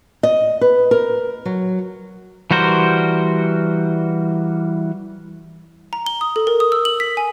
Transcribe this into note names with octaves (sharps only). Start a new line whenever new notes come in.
D#5
B4
A#4
F#3
E3 G3 F#4 A#4 C5
A#5
G7
D#6
A4
A#4
D#6
E6
F#7
B6
G#5